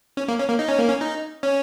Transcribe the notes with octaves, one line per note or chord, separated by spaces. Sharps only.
C#4
A#3
C#4
A#3
D#4
C#4
A#3
C#4
D#4
C#4